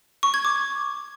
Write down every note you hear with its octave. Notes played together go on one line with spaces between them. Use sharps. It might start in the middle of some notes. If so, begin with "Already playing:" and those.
C#6
G#6
D6